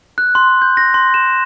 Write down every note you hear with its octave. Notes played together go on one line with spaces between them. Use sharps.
F#6
C6
G6
A#6
C6
E7